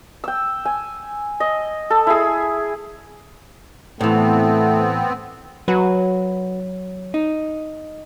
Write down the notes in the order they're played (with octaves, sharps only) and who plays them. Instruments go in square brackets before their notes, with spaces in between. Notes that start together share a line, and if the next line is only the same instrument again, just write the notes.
[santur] G5 E6
G#5
D#5
A4
E4 G#4
[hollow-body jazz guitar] A2 E3 [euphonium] A3 [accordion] B3 C4
[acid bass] F#3 [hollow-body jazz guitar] F#4 B4
[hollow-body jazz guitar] D#4